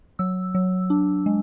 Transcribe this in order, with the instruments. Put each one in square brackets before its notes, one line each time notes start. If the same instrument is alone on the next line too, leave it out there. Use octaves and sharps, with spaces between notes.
[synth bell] F#3 E6
F#3
D4
G#3